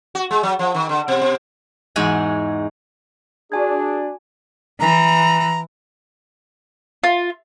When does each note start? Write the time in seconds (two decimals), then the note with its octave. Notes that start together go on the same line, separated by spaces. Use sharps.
0.15 F#4
0.31 G#3
0.43 F#3
0.59 F3
0.74 D#3
0.89 D3
1.08 B2
1.21 B2
1.96 E2 G#2 G#3 F#4 G#5
3.52 D4 F#4 G#4 G#5 G#6
4.80 E3 A#5
7.04 F4